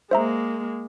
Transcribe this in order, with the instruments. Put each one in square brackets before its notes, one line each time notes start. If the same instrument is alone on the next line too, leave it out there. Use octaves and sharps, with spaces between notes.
[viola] G#3 A#3 [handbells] C5 E5 A#5